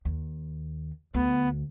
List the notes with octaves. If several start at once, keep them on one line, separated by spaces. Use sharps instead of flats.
D#2
D2 B3